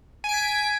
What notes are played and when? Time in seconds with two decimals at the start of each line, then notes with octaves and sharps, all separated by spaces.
0.24 G#5
0.29 D7
0.34 B6